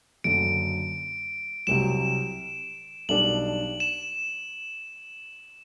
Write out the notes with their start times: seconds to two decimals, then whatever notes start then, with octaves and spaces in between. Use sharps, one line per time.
0.24 F#1 F#2 D3 D7
1.67 C2 C3 F#3 E7
3.09 B1 B2 G3 D4 F#7
3.80 E7